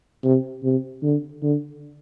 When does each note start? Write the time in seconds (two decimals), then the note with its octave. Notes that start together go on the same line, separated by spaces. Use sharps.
0.24 C3
0.63 C3
1.03 D3
1.42 D3